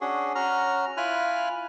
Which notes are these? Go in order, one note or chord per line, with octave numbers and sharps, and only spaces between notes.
C#4 D4 F#4 G#4
C#4 F#4 A#5 F6
E4 F4 G#5 B5 F6 F#6